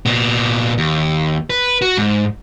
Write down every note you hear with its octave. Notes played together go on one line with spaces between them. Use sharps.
A#2 B3
D#2
B4
F#4
G#2